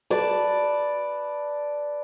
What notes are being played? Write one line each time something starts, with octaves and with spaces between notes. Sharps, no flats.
B4 D5 A5